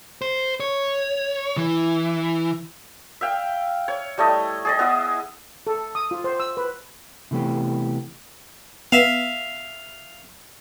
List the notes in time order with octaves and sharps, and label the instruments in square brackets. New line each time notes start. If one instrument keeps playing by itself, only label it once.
[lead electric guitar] C5
C#5
E3
[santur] E5 F5 G5
C#5
G3 A3 E4 D#5
G#4 D5 D#5
B3 E4 D#5
[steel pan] A4
D#6
F4
C5
E6
B4
[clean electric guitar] C3 E3 A3 B3 G4
[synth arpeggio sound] B3 [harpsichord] E5 F5